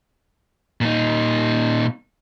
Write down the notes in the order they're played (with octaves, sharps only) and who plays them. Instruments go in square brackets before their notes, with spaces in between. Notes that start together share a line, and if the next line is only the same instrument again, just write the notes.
[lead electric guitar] A#2 D#4